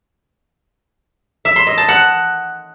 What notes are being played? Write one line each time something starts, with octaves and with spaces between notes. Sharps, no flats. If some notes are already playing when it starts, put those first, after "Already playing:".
E5
C6
D#5
A5
F#5